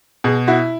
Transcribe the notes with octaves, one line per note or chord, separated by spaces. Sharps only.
B2 G#4
E4 F#4